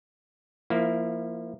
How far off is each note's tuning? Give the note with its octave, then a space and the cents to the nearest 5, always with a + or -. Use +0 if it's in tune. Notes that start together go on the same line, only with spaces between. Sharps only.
F3 -20 A#3 +0 E4 +0